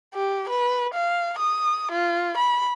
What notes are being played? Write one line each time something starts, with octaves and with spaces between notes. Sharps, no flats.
G4
B4
F5
D#6
F4
B5